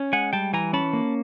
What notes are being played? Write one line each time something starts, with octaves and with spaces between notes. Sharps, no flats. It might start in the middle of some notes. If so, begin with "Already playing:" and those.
Already playing: C#4
G#3 F#5 G#5
G3 G5 A5
E3 G#5 A#5
C#4 A5 B5
A#3